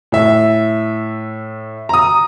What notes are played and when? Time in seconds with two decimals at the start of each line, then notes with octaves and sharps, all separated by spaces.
0.12 A2 E5
1.89 A#5 D#6